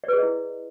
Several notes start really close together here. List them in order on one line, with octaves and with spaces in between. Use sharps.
D5 B4 G#4 D#5 E4